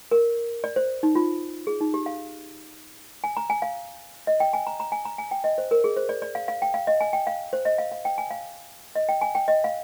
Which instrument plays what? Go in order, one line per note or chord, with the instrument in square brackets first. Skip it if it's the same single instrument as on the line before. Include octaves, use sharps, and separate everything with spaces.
[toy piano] A#4
D5
C5
D#4
F4
G#4
D#4
G4
F5
G#5
A#5
G#5
F5
D#5
G5
G#5
A#5
A#5
G#5
A#5
G#5
G5
D#5
C5
A#4
G#4
C5
D5
D5
F5
F5
G5
F5
D#5
G#5
G5
F5
C5
D#5
F5
F5
G5
G#5
F5
D#5
G5
G#5
G5
D#5
F5